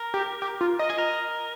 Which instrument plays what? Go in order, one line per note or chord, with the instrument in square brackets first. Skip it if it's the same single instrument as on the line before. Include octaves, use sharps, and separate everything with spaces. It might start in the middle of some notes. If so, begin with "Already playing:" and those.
Already playing: [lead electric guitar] A#4
[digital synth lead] G4
G4
F4
D#5
[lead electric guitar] G#4
A#4